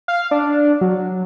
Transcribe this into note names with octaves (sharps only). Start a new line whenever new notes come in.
F5
D4
F#3